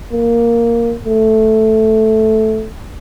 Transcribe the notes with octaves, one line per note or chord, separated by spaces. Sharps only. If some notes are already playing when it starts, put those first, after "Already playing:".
A#3
A3